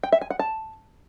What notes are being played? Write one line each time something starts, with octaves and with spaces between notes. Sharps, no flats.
G5
E5
G#5
F#5
A5